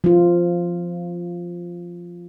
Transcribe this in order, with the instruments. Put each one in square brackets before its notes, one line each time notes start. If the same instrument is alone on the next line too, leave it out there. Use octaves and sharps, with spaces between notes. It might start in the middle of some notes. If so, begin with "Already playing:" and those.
[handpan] F3 F4